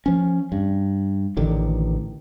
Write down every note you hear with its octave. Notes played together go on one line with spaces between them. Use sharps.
F3 C#4
G2
A1 D3 D#3